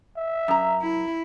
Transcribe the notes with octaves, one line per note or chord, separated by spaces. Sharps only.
E5
F#2 A#5
E4